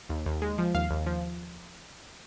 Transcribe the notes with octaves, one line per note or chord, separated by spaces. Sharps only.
D#2
D#2
G#3
F3
D#2 F5
D#2
F3